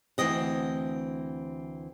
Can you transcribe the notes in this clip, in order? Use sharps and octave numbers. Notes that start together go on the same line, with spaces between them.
D2 E3 C4 D#5 F#5